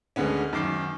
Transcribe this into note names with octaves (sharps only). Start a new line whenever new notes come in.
D2 D3 G#3 B3 C#4
F#2 D#3 D6 C7